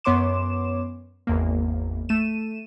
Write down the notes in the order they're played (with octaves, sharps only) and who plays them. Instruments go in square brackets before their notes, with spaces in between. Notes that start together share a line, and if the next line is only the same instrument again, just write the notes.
[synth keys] F#2 B3 C#5 C6 D6 E7
G#1 E2 A#3
A3 D#7 E7